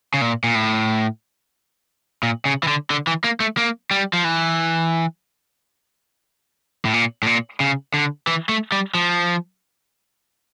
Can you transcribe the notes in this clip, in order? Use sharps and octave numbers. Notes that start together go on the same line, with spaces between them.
C#3
A#2
A#2
A2
A#2
C#3
E3
D3
D3
E3
A#3
A3
A#3
G3
F3
E3
A2
A#2
A2
A#2
C#3
D3
E3
A3
G3
F3